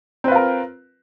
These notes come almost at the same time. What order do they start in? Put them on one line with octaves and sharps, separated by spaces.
C4 B4 F4 A#4